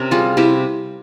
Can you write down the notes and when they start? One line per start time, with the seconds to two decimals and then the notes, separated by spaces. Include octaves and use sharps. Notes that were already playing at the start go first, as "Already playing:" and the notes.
Already playing: C3 C#4 A#4
0.11 G3 F4 G#4
0.37 C3 E4 G4